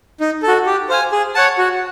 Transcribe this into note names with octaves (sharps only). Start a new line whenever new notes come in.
D#4
A4
F#4
G4
C5 F5 G#5
G#4
C#5 F#5 A5
F#4